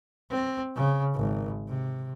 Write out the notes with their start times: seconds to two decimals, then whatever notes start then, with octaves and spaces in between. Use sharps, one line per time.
0.31 C4
0.76 C#3
1.14 G#1
1.68 C3